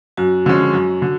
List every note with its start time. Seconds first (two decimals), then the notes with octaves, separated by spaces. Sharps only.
0.17 F#2 F#4
0.46 D3 F3 G#3 C#4
0.74 F#2
1.02 D3